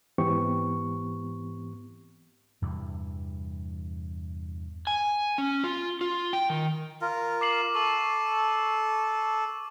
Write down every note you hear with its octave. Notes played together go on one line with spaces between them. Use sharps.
G#2 E3 B3 C4 G4 C#6
E2 G2 C3 E3
G#5
C#4
F4
F4
G5
D#3
F4 A#4
D6 C7 F#7
A4 C#6 F#7